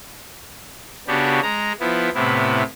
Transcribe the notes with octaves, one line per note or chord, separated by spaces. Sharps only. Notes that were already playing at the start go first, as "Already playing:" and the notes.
C#3 B3 D4 F#4 G4
G#3 A#5
F3 B3 E4
A2 C3 B3 E4